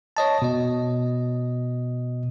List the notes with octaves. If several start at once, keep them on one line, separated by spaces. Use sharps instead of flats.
C#5 D#5 A5
B2 D#5